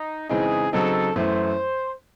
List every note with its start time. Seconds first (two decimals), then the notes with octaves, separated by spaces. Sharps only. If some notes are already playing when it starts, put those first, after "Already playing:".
Already playing: D#4
0.29 C#3 E3 G#3 C4 D#4 G#4
0.73 C#3 F#3 C4 D#4 A4
1.15 F#2 E3 A3 C5